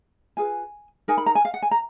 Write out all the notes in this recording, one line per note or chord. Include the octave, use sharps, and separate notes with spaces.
F4 G#4 B4 G#5
D#4 A#4 G#5
B5
A#5
G#5
F5
F#5
G#5
A#5